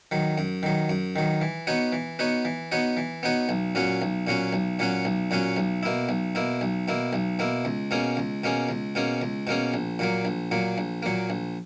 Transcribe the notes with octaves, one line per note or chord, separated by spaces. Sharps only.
D#3 F#3
F#2
D#3 F#3
F#2
D#3 F#3
E3
B3 D#4 F#4 C#5
E3
B3 D#4 F#4 C#5
E3
B3 D#4 F#4 C#5
E3
B3 D#4 F#4 C#5
B1
A#2 F#3 C#4 F#4
B1
A#2 F#3 C#4 F#4
B1
A#2 F#3 C#4 F#4
B1
A#2 F#3 C#4 F#4
B1
B2 A#3 E4
B1
B2 A#3 E4
B1
B2 A#3 E4
B1
B2 A#3 E4
C#2
B2 A#3 C#4 G#4
C#2
B2 A#3 C#4 G#4
C#2
B2 A#3 C#4 G#4
C#2
B2 A#3 C#4 G#4
A#1
A#2 F#3 A#3
A#1
A#2 F#3 A#3
A#1
A#2 F#3 A#3
A#1